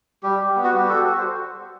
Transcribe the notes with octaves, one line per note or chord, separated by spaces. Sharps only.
G3 G4
G3
B3
F#4
G3 G4
F#4 A4
F#4
C5